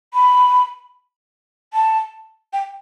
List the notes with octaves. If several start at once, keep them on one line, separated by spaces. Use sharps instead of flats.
B5
A5
G5